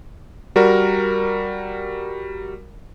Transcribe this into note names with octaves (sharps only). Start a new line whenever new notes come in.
G3 F#4 A#4